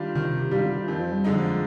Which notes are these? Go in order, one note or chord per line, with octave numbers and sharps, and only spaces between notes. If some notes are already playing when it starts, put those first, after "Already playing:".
Already playing: D#3 G3 D4 F4
C3 D#3
C3
C3 G3 D4 F4
D3
F3
F2 D#3
F3
G3
D3 G#3 D#4
F3